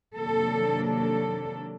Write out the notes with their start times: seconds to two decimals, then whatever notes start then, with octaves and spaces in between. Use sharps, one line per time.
0.16 C3 D#3 F#3 A#3 D4 A4
0.87 A4